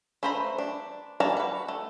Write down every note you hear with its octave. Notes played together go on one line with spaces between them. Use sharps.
A3 B4 C5 A#5 B5
D4
G3 A#3 F#5 A5 A#5
F#4 B4
A3